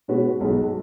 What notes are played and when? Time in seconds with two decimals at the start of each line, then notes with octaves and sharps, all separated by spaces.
0.08 B2 G#3 C#4 F#4 B4
0.40 B1 B2 G#3